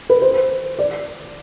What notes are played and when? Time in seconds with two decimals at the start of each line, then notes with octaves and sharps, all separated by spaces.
0.10 B4
0.22 C5
0.79 D5